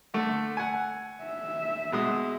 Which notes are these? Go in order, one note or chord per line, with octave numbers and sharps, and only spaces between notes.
D3 A3
F#5 G#5
E5
B2 G#3 D#6